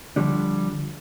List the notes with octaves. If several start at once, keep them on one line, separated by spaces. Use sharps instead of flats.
D3 F3 G3 D4